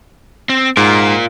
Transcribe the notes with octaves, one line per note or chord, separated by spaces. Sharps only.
C4
G#2 F4 A#4